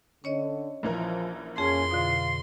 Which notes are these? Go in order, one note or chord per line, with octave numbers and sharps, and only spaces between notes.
D3 C#4 C#5 D#5
A#1 E3 F3 A#4
F2 A#3 C#4 G#4 C6
B2 D3 F4